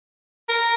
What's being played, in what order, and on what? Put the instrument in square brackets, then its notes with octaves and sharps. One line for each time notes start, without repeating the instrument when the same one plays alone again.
[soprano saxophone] A#4